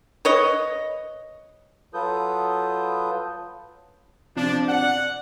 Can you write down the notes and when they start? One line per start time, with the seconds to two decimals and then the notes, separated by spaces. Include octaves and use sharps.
0.25 B4 C#5 D#5
1.94 F#3 F4 A4 B4 D#6 G6
4.36 C3 F3 D4
4.69 D5 F#5